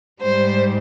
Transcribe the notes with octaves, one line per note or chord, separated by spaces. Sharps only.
G#2 G3 C5